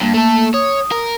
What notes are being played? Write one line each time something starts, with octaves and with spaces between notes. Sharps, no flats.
G2 A#3
A3 A4
C#5 D#6
A#4